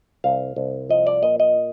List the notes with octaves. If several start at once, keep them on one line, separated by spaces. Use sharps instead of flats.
C2 F5
C2
F3 D#5
D5
A#2 D#5
D#5